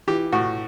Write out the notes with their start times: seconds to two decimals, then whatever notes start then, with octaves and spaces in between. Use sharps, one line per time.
0.07 E3 G4
0.33 A2 F#4